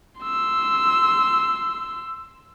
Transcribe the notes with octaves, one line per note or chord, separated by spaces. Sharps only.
C6 E6